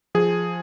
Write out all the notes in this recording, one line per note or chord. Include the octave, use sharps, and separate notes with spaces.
F3 G#4